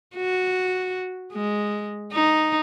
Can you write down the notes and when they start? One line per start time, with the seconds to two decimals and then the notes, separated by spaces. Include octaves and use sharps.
0.16 F#4
1.32 G#3
2.13 D#4